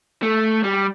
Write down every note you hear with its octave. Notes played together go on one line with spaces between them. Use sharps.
A3
G3